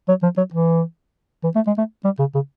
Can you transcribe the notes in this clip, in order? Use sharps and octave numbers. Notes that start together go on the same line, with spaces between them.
F#3
F3
F#3
E3
E3
A3
G#3
A3
G3
C#3
C#3